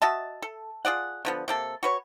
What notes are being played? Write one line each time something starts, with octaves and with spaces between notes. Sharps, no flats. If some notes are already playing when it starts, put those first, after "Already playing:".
F#4 D#5 E5 A5
A4
F4 G#4 D5 F#5
D3 F3 B3
C3 A#3 A4
F#4 B4 C#5